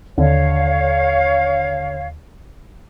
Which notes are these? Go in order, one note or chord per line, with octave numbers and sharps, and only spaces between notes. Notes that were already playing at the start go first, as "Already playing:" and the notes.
D#2 D3 C#5 F5